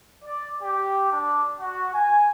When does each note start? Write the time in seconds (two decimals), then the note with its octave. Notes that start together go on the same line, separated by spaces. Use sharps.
0.22 D5
0.62 G4
1.12 D4
1.59 F#4
1.94 G#5